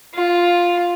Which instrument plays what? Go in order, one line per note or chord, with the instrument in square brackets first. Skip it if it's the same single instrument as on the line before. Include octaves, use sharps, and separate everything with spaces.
[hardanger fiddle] F4